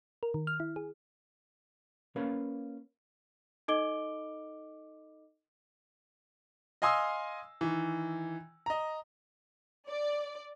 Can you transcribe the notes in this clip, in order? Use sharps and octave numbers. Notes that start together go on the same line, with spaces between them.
A#4
D#3
F6
E4
G#4
A#3 C#4 A#4 B4 C#5 F5
D#4 A4 D#5 D6 D7 G7
D#5 F5 G#5 C6 D#6 E6
D#3 E3
D#5 A#5
D5